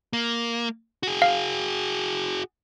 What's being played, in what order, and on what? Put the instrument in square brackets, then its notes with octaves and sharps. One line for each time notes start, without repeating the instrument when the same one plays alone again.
[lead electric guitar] A#3
F#4 G#4
[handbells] F5